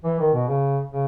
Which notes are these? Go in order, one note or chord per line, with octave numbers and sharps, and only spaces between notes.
E3
D#3
B2
C#3
C#3